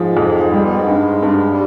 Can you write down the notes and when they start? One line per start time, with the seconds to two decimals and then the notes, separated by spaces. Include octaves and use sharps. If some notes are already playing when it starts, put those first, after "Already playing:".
Already playing: G#2 F3 G#3
0.17 F2
0.51 G3 G#3
0.63 B3
0.74 G#2 G#3
0.87 G2
1.22 G2 G3
1.36 G#3
1.49 G3